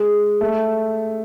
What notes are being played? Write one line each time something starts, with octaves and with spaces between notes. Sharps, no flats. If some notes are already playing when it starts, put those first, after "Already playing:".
Already playing: G#3
A3